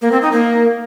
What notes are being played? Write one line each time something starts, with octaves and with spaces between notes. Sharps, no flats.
A#3
C4
D#4
A#3